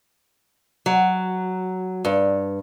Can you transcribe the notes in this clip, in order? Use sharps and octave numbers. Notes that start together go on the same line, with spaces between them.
F#3
G2